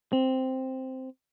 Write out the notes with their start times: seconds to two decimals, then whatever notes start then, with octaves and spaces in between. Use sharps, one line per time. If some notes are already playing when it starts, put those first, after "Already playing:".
0.13 C4